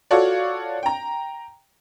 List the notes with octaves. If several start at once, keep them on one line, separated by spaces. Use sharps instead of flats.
F4 F#4 A4 C#5 D5
G5 A#5